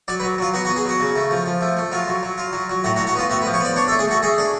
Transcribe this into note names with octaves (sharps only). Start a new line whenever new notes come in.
F#3 D5
B4
F#3
F#3 F4
B3 F#4
F#4
B3
G#4
F#3 F#4
C#3
A3
F3
F3
A3
A3
F#3 F4
F#3
F#3
F4
F#3
F#3
A2 F#4
F#4
A2
F#4
B3 F4
A2 F#4
B4
F3
C#5
B3 D5
D4 C#5
A4
A3
G#4
A3 F#4
A3 G#4
D4